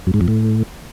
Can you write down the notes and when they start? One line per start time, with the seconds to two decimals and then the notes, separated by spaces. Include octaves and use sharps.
0.07 F#2
0.14 G#2
0.21 F2
0.28 A2